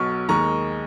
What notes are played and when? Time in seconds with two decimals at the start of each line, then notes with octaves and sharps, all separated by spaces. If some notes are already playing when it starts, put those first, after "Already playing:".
Already playing: B1 B2 F#3 C#6 F6
0.29 D#2 D#3 G#3 A#5 C#6